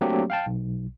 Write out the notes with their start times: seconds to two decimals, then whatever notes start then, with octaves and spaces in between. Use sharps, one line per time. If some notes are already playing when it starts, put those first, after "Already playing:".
0.01 F#3 A3 A#3 C4 D4 G4
0.30 F5 G5 A5
0.46 B1